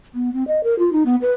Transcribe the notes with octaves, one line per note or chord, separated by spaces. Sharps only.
B3
C4
D#5
A#4
F4
D#4
B3
B4